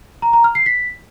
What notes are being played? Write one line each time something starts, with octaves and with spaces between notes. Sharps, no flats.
A#5
A#5
F6
C7
B6